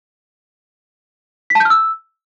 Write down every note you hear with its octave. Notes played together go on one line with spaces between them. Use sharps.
B6
A5
G6
F6
E6